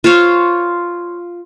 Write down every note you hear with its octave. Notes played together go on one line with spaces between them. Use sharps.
F4 C5 C#5 F5